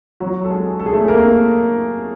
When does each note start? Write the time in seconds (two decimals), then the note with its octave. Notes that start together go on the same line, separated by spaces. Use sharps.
0.20 F#3 F#4
0.44 A4
0.50 G#3 G#4
0.80 A4
0.86 G#4
0.93 A3 A4
1.08 A#3 A#4